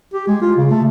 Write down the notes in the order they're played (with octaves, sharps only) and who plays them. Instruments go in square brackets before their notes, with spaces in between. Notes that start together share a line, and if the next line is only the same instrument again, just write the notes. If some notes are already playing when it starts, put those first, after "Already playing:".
[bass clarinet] G4
G#3
F4
C#3
A3